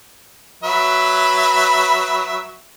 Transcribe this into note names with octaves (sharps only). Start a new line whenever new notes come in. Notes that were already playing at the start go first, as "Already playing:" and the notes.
F#3 B4 E5